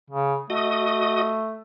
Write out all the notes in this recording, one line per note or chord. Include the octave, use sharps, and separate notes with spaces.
C#3
A3 F#4 D#5 D#6